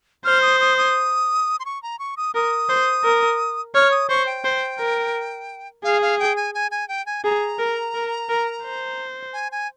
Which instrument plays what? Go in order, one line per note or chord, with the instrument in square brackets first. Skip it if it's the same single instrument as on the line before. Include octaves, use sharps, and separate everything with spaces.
[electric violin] C5 [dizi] F6
[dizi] D#6
D#6
D#6
C6
C#6
A#5
C#6
D#6
[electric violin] A#4 [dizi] D#6
[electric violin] C5
A#4
[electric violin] C#5 [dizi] F6
[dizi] D#6
[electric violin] C5 [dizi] C#6
[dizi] G5
[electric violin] C5
A#4
[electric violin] G#4 [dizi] F5
[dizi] F5
G5
G#5
G#5
G#5
G5
G#5
[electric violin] G#4 [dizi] A#5
[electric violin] A#4
A#4
A#4
C5
[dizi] G#5
G#5